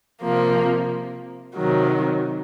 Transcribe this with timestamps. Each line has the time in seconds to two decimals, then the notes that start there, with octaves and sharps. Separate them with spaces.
0.21 C3 F3 A#3
1.54 C3 D#3 F#3